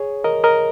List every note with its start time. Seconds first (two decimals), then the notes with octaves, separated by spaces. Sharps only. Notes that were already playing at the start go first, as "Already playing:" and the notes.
Already playing: G#4 C#5
0.24 A#4 D#5
0.44 A#4 D#5